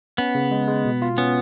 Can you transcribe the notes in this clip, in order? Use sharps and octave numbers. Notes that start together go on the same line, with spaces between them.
B3 C#4
C#3
G#3
G#3
B2
F4
B3 C#4